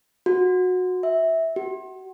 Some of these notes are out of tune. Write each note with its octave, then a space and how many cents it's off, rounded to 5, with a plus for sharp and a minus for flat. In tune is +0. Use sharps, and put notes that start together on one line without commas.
F#4 -20
E5 -15
F#4 +30